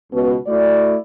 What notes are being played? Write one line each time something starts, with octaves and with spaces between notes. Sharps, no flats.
C#2 B2
A3 E4 F#4 D5